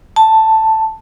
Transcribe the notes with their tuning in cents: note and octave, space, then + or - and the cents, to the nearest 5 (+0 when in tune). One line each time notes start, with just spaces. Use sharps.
A5 +5